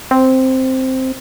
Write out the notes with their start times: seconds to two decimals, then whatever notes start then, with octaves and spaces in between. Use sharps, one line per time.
0.11 C4